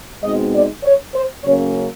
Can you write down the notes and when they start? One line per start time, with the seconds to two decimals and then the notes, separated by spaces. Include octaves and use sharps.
0.23 B2 G#3 C4 D#4 D#5
0.54 D5
0.84 C#5
1.14 C5
1.44 C#3 F#3 A#3 C#4 C#5